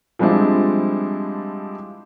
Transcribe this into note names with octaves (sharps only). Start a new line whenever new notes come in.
F3 G3 G#3 C4 D4 E4